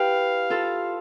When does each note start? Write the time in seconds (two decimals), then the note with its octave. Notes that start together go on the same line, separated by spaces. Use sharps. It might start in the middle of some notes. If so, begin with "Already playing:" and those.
Already playing: E4 G4 B4 F5
0.50 F4 A4